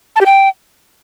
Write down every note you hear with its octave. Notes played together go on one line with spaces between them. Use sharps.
A5
G4
G5